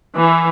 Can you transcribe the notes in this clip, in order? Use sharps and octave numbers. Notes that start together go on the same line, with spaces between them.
E3